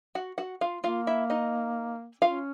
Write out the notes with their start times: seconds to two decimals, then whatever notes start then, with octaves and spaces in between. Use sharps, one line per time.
0.15 F#4 F#5
0.38 F#4 F#5
0.61 F4 F5
0.84 A#3 F4 F5
1.07 E4 E5
1.30 D#4 D#5
2.22 C#4 F4 F5